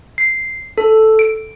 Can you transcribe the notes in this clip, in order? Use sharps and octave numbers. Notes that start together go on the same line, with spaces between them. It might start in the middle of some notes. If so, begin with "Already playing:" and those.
C7
A4
D7